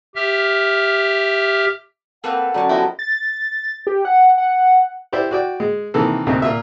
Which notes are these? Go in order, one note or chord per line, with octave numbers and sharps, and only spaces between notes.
G4 E5 F6
A#3 C4 A4 B4 F#5
D3 F#3 A3 C#4 D5
F3 B3 E4 G4 D#5
A6
G4
F#5
F#5
E4 G4 C5 D5
F#4 D5 G5
G#3
C3 D#3 E3 A#3 A4
D2 C3 A#3 C4 D#4
A#2 F4 E5